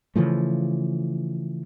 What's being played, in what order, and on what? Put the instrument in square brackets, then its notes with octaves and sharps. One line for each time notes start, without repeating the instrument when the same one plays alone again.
[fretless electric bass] C#3 E3 F3 A3